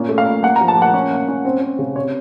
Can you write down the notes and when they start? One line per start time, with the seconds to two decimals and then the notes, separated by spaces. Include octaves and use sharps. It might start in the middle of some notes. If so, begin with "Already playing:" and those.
Already playing: A#2 C#4
0.09 A3
0.18 F5
0.26 A#2
0.43 A#3 F#5
0.56 A#5
0.61 F3
0.68 A5
0.77 A#3
0.82 F#5
0.94 C#4
1.11 A#3
1.28 C#4
1.45 C4
1.61 C4
1.79 C#3
1.96 C3 C#5